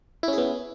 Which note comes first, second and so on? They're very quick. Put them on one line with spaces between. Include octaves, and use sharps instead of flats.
E4 C#4 G#4 B3